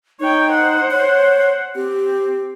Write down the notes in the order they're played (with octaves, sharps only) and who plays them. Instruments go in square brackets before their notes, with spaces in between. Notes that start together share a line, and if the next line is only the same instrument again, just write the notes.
[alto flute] D#4 [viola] C#5 G5
[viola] C5 F#5
[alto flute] C#5
[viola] C4 [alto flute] G4